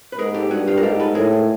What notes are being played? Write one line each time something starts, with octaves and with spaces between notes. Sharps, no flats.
B4
G#2 G#4 A#4
G4 A4
G2 F#4 G#4
F4 G4
A#4
G#2 G4 A4
A4 B4
A2 G#4 A#4